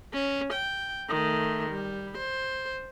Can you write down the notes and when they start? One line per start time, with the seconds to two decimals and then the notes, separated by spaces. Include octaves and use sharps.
0.13 C#4
0.53 G5
1.09 D#3 A3
1.70 G3
2.17 C5